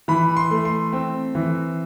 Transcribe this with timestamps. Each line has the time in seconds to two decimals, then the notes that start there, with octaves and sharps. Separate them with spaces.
0.08 E3 B5
0.37 C6
0.51 A3
0.65 C6
0.93 C4
1.35 E3